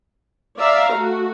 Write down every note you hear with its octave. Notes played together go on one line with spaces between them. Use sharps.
D5 E5 F5 A#5
A3 F#4